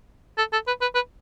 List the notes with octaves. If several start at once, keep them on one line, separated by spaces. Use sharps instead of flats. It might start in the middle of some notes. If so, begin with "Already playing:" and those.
A4
A4
B4
B4
B4